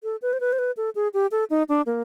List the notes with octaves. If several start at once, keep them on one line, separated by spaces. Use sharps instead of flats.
A4
B4
C5
B4
C5
B4
A4
G#4
G4
A4
D#4
D4
A#3